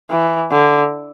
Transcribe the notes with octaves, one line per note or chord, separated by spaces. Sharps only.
E3
D3